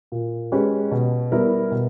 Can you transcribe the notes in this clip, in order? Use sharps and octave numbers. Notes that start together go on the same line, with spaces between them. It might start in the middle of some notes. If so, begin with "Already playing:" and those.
A#2
G#3 C#4 G4 B4
B2
G3 B3 E4 A#4
B2